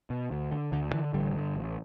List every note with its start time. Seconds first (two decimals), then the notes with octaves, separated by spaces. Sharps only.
0.10 B2
0.31 D2
0.51 D3
0.72 D2 D3
0.93 D3 E3
1.13 A1 D3 G3
1.34 G2 D3
1.55 A1